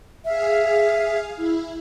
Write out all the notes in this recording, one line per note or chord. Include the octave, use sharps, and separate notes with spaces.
G#4 E5 F5
E4